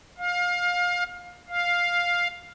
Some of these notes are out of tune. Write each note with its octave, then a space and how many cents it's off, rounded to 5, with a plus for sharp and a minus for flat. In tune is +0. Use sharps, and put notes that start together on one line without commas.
F5 +25
F5 +5